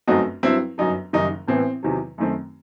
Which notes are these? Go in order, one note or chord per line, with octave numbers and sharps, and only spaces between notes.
G1 F#2 F#3 A3 C4 D#4 F#4
G2 F#3 C4 E4
G1 F#2 F#3 D#4
F#1 F#2 D#3 G3 D#4
A1 A2 E3 B3 C4
E2 C3 D#3 F#3
F#2 D#3 A3 C4